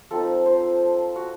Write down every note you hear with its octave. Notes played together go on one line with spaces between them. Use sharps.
F3 C4 D#4 A4
C5
F#4